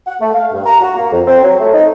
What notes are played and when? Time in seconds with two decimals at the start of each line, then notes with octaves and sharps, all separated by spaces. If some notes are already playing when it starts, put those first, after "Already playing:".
0.07 F#5
0.20 A3
0.34 F5
0.53 G2
0.66 A#5
0.81 F#4
0.96 A#3
1.12 F2
1.27 C4
1.43 F#3
1.60 A3
1.73 D#4